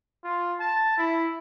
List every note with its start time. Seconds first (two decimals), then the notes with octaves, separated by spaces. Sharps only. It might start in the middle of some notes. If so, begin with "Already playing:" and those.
0.24 F4
0.60 A5
0.98 E4